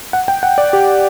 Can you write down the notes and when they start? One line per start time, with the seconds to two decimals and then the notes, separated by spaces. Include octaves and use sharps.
0.13 F#5
0.28 G5
0.43 F#5
0.58 D5
0.73 G4